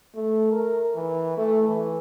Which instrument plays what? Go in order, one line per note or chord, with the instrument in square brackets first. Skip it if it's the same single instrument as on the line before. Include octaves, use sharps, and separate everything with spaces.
[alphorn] A3
A#4
E3
A3
E3